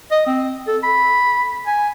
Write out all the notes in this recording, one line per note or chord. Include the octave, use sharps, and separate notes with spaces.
D#5
C4
A4
B5
G#5